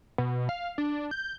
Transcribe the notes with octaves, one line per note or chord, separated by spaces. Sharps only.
B2
F5
D4
G6